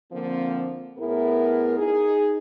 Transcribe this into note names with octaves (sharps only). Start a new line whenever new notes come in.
D3 F3 A#3 C4
A2 B3 E4 G#4 A#4
D#4 G#4